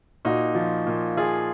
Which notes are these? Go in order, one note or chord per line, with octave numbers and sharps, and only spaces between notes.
A#2 D#4 F#4
F3
A#2
F3 F4 G#4